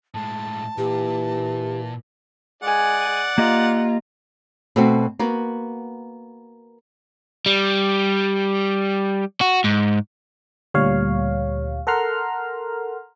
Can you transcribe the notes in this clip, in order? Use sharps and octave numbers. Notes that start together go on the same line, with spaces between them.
A2 G#3 A5
A#2 E3 G4
G#3 D5 F#5 G#5
A#3 F4 G4 D#5 A#5
B2 A3 C4 F#4
A#3 B3 F#4
G3
F#4
G#2
D2 A#2 G3 C#5 F5
A4 A#4 F#5 A#5 C6 F6